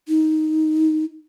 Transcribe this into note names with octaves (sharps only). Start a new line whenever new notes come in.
D#4